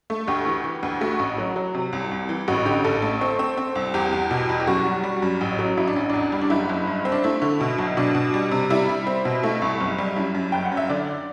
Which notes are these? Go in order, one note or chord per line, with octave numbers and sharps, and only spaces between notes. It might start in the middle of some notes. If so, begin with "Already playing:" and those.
A3
D2 G4
E3
E3
D2
A3 F#4
A1
F#3
F#3
C3
C2
C2
E3
A1 F#4
D3 G4
A1 A4
A3
C4
C4
C4
C2
E2 G4
E2
B2
E2
G4
F#2 F#4
G3
G3
F#2
A1
F#3
A1 E4
D4
A1
E2 D4
G3
D4
F#1 E4
F#1
G2
C4
D4
A3 E4
D3
B2
B1
B2 D4
B2
G3
C3
G3 E4
G3
C4
B2
A3 E4
C2
F#1
G3
F#2 E4
F#2
F#1 G5
F#5
F#2
E5
D3 D5